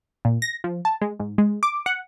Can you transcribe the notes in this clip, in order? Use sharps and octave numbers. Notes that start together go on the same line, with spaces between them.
A#2
A#6
F3
A5
G#3
G#2
G#3
D6
F#5